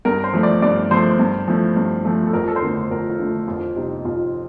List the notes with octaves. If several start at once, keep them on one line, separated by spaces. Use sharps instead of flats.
G2 A#4
C5
F3 A3
D5
G2 D5
F3 A3 C5
G2
F3 A3
G2
F3 A3
A4
F2 A#4
A4
C5
D3 A3 A#4
C5
F2 A#4
F4
D3 A3
F2 F4
C3 G3 D#4
F2 F4